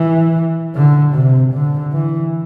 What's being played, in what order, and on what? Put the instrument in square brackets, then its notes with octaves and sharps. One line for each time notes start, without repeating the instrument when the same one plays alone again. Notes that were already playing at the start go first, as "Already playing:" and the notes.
Already playing: [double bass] E3
D3
C3
D3
E3